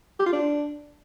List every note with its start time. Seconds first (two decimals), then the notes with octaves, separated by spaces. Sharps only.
0.19 G4
0.26 F4
0.32 D4